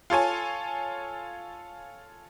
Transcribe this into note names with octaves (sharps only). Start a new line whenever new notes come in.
F4 A4 C#5 G#5